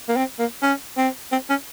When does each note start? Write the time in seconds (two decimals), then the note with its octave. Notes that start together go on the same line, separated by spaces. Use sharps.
0.09 A#3
0.17 C4
0.39 A#3
0.62 C#4
0.97 C4
1.32 C4
1.49 C#4